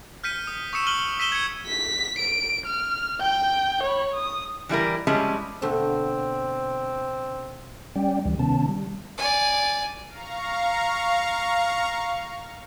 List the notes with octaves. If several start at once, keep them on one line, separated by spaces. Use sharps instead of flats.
F6 G6 B6 C#7 D#7
D#6
C#6 D#6 E6 C#7 E7
F6 D#7 F#7 G7
E6 B6 D#7 E7 G7
G#6 C#7
B6
D7
F6
G5 G6
C#5 B5
D#6
E3 G3 E4 A#4
F3 G3 G#3 C#4 E4
B2 D3 A3 C4
G3 C#4 D5 G5
D2 E3 G3
C3 D#3 B3 C#4 A5
G3
D5 G#5
F5 A#5 C#6